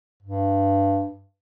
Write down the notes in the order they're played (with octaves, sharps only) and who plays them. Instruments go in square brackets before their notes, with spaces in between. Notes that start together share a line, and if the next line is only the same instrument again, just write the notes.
[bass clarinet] G2